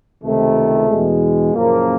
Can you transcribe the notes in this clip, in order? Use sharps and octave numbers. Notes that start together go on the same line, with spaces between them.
C#2 C3 D#3 A3
E2 B2 G#3
F#1 F#2 A#2 C#3 F3 A#3